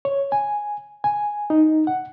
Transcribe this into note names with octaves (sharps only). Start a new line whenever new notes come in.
C#5
G#5
G#5
D#4
F#5